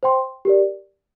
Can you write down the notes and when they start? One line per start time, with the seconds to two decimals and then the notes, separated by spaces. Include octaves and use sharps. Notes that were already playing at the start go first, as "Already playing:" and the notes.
0.03 C5 G5 C6
0.45 G4 A#4 D5